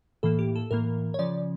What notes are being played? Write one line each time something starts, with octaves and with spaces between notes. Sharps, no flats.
A2 E3 A#3 A4
G4
A4
A2 E3 A#3 A#4
C#5
C#3 F3 C#4 D5